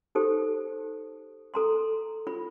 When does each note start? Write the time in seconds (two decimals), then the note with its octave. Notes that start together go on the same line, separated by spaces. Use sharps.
0.15 D#4 G4 A4 C5
1.54 A4 A#5 C6
2.27 F4 B5